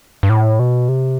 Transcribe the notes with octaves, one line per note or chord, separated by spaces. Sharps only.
G2
A2
B2
C3